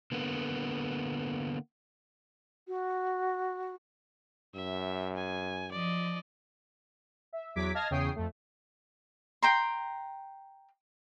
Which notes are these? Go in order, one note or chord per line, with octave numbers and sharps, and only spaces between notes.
D3 A#3 B3
F#4
F#2 E5
G#5
F3 D5 D#5
E5
E2 F#3 D6 G#6 B6
D#5 F5 A5 F6 G#6 A#6
E2 C#3 C#5 G5 D#6 C7
F2 A3
G5 A#5 C6